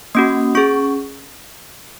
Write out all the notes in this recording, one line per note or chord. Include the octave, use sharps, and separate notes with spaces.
A#3 C#4 F#4 D#6
C#4 G#4 C#6